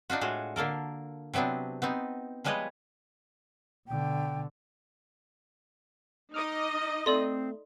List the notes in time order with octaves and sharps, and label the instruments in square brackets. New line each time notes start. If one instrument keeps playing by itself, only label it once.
[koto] D4 D#4 F4 F#4
A2 G#3 F4 F#4
D3 A#3 A4 A#4
C3 F#3 B3 C4 D4
B3 C4 D#4
F3 G3 G#3 B4 C#5 D#5
[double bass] B2 D3 [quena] G5
[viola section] D#4 D#5 [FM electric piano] D6 D#6 F6
[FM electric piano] A3 [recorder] C4 [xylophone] A4 D5 C6